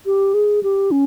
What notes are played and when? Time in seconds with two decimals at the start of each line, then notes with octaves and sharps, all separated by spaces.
0.06 G4
0.34 G#4
0.63 G4
0.91 C#4